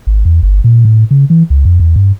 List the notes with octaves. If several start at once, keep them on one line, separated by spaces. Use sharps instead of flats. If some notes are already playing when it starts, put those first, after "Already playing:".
G#1
E2
G1
A#2
A2
C#3
E3
C#2
F2
E2
G2